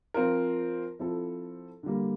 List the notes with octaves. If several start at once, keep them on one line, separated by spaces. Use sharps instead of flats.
F3 C4 F4 A#4
F3 C4 E4 A4
D3 G3 A#3